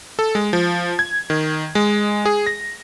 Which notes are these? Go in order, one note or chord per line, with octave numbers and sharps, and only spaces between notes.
A4
G#3
F3
G#6
D#3
G#3
G#4
A#6